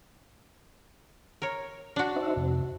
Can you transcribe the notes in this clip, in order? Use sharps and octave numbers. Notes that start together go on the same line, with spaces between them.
A#4 C#5
D4 F#4
D#4 C5 E5
F2 C3